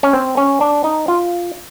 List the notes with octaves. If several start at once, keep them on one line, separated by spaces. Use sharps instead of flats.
C#4
C4
C#4
D4
D#4
F4